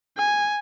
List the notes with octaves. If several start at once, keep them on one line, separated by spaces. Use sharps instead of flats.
G#5